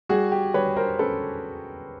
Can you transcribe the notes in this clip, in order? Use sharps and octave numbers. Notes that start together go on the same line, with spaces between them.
G3 F#4 G#4
G4
G3 B4 C#5
A#4 C5
C#4 A4 B4